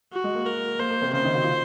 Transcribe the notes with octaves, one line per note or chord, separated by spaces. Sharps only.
F#4
G#3
A#3
A#4
A#3 C5
A#3
C3 C4
C#3 C#4 C5
D#3 D#4
F#4
F4